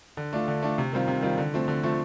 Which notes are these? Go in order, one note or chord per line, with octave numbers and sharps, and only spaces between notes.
D3
A3 D4 F4
D3
A3 D4 F4
C3
D#3 G3 C4 F4
C3
D#3 G3 C4 F4
D3
F3 A3 C4
D3
F3 A3 C4